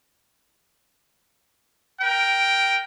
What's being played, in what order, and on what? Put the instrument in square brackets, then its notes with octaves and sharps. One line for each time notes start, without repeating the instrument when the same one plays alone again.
[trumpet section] A#4 G5